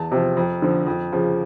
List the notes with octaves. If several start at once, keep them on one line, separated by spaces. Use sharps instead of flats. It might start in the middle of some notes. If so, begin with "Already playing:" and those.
Already playing: E2 A5
C3 F3
F2
D3 F3
F2
C#3 F3